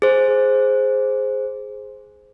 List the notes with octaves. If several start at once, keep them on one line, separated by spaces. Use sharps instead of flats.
G#4 C5